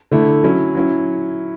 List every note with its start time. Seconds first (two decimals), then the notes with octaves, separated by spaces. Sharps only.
0.11 D3 A3 E4
0.43 F#3 C#4 E4
0.74 F#3 C#4 E4